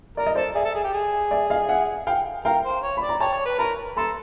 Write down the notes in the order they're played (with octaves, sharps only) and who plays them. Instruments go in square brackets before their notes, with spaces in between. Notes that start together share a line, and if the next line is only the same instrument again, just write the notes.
[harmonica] A#4 [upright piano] D5
[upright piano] D#5
[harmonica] A4 [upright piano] C5 D5
[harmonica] G#4 [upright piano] D5 E5
[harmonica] A4
G#4
G4
G#4
[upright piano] D5 E5
D#5 F5
E5 F#5
F5 G5
[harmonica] A#4 [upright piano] F5 G5
[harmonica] C5
C#5
[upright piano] B5
[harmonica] D5
[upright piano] A#5
[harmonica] C#5 [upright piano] G5 A5
[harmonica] C#5
B4
[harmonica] A#4 [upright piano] A5 B5
[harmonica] A4 [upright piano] A#5 C6